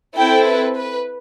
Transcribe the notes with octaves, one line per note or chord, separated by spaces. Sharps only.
C4 E4 A4 G5
B4
B4